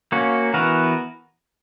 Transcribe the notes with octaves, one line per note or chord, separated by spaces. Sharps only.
A#3 C#4 F#4
E3 B3 F#4 A#4